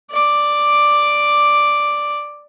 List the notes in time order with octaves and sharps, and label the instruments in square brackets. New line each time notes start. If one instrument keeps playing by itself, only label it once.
[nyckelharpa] D5 D6